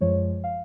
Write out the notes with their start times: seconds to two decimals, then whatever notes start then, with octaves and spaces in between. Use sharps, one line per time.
0.01 F#2 F3 G#3 C#5
0.44 F5